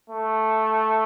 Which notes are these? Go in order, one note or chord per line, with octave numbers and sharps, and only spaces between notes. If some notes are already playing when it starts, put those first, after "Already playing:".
A3